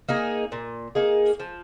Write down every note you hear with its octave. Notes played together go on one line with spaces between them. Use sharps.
A#3 D#4 G#4
A#2
A#3 D#4 G#4
F3